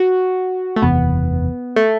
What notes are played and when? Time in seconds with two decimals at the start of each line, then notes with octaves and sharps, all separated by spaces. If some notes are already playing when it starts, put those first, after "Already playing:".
Already playing: F#4
0.76 A3
0.82 F#1 E2 C3 E3 B3
1.76 A3